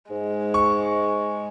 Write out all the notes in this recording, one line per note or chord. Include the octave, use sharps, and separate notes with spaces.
G#2 G#3
C#6